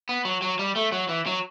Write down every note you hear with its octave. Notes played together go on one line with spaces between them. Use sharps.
B3
F#3
F#3
G3
A3
F#3
E3
F#3